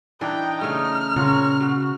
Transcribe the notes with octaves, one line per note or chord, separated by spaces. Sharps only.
E3 D4 D#4 G5
C#3 A3 F6
A#2 C#3 C4 F4 C#5 F#5 A#5
B2 F#4